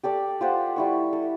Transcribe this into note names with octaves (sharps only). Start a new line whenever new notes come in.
G4 A4 D5
F4 G4 C5 F#5
G3 E4 C#6
A4